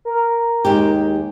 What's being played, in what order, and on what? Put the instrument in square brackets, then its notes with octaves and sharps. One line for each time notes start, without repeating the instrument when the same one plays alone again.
[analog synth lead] A#4
[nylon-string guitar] D#2 G#3 G4